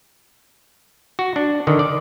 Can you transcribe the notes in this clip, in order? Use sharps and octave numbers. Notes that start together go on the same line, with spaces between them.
F#4
D4
D3 D#3
D5